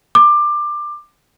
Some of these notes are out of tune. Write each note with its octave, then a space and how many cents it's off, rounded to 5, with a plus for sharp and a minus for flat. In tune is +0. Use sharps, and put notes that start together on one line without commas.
D6 +20